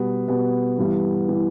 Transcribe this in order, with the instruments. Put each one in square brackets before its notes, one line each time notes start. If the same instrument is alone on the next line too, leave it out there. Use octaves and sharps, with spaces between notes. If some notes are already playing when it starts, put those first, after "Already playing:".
Already playing: [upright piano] B2 G3 B3
B2 G3 B3
G2 E3 G3
E3 G3